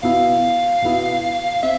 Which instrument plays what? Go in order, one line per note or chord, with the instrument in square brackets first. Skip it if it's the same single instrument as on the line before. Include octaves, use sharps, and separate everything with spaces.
[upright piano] B2 B3 E4 [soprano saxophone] F5
[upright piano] B2 B3 E4
[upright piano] C4 [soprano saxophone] E5